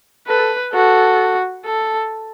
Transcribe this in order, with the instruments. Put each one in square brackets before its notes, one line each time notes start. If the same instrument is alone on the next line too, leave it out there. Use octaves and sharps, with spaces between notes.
[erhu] A4 [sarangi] B4
[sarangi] F#4 [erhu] A4
[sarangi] A4